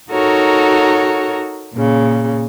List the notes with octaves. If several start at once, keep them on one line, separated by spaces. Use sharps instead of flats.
D#4 F#4 A4 A#4 C#5
A#2 C#3